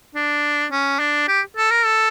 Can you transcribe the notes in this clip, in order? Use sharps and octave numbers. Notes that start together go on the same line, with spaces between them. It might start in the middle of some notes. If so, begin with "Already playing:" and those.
D4
C#4
D4
G4
A4
A#4
A4